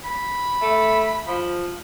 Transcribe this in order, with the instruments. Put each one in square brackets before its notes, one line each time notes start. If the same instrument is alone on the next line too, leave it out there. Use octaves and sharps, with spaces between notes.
[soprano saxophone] B5
[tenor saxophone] A3
F3